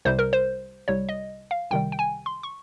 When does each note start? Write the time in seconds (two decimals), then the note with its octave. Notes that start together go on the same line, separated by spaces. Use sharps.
0.05 C2 C3 G3 C5
0.19 A#4
0.33 C5
0.88 C2 C3 G3 C#5
1.09 D#5
1.51 F5
1.71 C2 C3 D#3 G3 G5
1.92 G5
1.99 G#5
2.26 C6
2.43 C#6